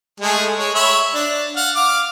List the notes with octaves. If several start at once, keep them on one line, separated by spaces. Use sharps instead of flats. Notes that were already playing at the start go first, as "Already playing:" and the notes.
G#3 A3 G#4
G#3 C#5
C#5 E5 B5
D4
F5 F#5
F5 D6